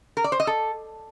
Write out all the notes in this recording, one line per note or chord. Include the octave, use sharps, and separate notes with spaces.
A#4
D5
C5
D#5
A4